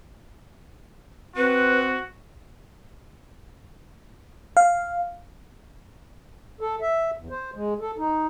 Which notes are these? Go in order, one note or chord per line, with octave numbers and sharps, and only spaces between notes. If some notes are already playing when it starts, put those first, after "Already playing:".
C4 F#4 B4
F5
A4
E5
E2
C5
G#3
A4
D#4